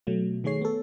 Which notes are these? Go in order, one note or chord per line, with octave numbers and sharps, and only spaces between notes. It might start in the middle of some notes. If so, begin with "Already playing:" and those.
B2 F#3 A3
D#3 A3 G#4 C#5 C7
B3 A4